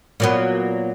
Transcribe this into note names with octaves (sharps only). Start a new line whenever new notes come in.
A#2 F#3 B3